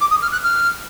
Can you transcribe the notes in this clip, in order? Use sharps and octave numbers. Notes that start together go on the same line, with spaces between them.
D6
D#6
F6
F#6
F6